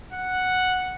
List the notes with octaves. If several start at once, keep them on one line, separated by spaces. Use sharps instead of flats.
F#5